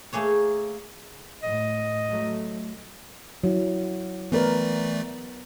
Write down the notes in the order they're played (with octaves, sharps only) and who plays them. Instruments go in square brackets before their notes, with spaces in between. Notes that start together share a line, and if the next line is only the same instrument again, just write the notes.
[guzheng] A3 A#3 G#4 C#5
[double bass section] A2 [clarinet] D#5
[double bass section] F#3 A3
[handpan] F#3 E4
[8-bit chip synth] E3 A3 D5 [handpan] B3 A#4 B4